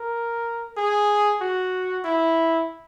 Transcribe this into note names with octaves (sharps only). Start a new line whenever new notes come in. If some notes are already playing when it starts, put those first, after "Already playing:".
Already playing: A#4
G#4
F#4
E4